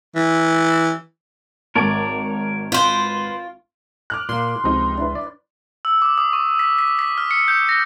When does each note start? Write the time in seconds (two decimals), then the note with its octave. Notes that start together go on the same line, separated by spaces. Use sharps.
0.15 E3
1.75 G#1 A#4 C#5 D5 A5 D7
2.72 F4 B4 C5
4.10 D6 F6 F#6
4.29 A#2 A#3 C6
4.64 C#2 C3 F3 D#4
4.98 D4 E4 B4
5.15 D5
5.85 E6
6.02 D6
6.18 D#6
6.33 C#6
6.59 B6
6.79 B6
6.99 B6
7.18 F6
7.31 C#7
7.48 G6
7.69 A#6